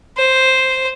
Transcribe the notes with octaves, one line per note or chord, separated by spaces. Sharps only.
C5